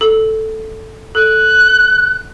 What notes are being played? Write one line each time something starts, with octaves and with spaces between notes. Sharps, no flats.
A4
A4 F#6